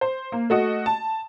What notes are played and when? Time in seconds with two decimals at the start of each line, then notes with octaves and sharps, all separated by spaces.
0.01 C5
0.32 A#3
0.50 A3 F#4 D#5
0.86 A5